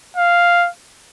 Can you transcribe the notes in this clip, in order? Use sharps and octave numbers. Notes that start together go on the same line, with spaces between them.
F5